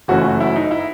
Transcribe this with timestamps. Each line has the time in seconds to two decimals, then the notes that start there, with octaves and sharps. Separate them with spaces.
0.08 F#1 F#2 E3 A3 C#4 F#4
0.24 F#4
0.40 E4
0.56 D#4
0.71 E4